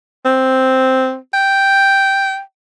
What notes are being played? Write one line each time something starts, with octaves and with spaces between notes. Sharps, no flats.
C4
G5